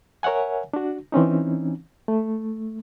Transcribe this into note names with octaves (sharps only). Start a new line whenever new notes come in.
A#4 C#5 E5 F#5 G#5
D4 F#4
E3 C4 C#4 D#4
A3